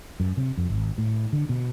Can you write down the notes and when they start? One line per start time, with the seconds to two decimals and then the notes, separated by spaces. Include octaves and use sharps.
0.20 F#2
0.37 C3
0.57 F2
0.70 G#1
0.98 A2
1.33 D3
1.49 B2